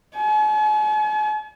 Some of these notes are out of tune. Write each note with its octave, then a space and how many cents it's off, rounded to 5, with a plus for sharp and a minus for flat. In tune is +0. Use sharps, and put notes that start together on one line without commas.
G#5 +45